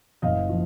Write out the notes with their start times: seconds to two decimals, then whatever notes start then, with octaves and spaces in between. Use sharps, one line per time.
0.22 F#1 D#5 F5
0.49 F3